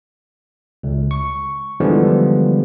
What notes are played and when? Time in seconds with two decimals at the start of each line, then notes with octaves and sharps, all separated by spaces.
0.83 C#2
1.11 C#6
1.80 D3 E3 F3 G3 G#3 B3